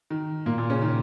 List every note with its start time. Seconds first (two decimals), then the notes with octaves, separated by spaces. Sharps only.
0.10 D#3
0.46 A#2 A#3
0.58 A#2 A#3
0.70 C#3 C#4
0.82 D#3